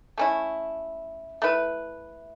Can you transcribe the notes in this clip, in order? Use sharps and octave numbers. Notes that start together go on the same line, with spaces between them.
A3 C#4 E4
A3 E4 B4